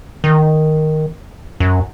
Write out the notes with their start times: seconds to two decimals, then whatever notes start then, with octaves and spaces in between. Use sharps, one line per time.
0.24 D#3
1.60 F#2